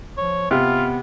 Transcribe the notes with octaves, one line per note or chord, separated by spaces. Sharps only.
F3 C#5
C3 B3 F4